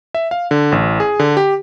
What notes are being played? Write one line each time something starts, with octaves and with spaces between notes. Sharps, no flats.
E5
F5
D3
A1
G#4
D3
G4